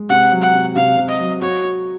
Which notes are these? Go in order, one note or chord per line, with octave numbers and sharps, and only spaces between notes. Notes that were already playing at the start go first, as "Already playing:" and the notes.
Already playing: G#3
C3 F#5
F#3
F#5
C3
C3 F5
C3
D#5
F#3
F#4 C#5
F#4